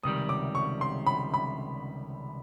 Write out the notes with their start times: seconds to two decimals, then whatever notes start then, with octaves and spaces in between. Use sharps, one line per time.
0.03 C#2 C3 D#3 G3 D#6
0.29 D6
0.55 C#6
0.81 C6
1.07 B5
1.34 B5